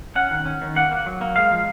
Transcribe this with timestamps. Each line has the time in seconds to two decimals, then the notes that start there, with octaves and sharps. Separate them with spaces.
0.15 C#4 F#5
0.31 D#3
0.46 C#4
0.62 D#3
0.76 A#3 F#5
0.91 A#3
1.06 F#3
1.21 A#3
1.36 G#3 F5
1.52 F3